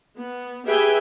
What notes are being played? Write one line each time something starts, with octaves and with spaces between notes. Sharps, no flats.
B3
G4 G#4 B4 E5 G5 G#5